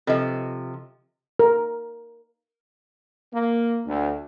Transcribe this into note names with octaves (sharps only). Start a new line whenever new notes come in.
C3 F3 A4 B4 D#5
A#4
A#3
D2